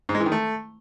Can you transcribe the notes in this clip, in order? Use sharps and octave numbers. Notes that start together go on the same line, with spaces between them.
G#2
G#3
E3
D#3
A3